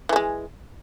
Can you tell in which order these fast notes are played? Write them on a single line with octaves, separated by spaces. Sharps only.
E3 A3 G#3